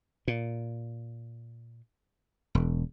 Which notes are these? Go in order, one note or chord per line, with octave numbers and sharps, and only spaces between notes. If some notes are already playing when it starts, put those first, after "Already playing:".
A#2
E1